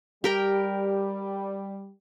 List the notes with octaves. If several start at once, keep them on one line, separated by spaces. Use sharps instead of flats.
G3 G4 A#4 G5